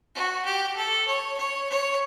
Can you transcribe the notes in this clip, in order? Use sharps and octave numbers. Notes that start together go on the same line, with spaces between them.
F#4
G4
A4
C#5
C#5
C#5